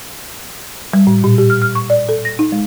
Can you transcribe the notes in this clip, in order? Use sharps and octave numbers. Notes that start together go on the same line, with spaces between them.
G3
A2
A#2
G4
F6
F6
C#6
D5
A4
A#6
D#4
G#3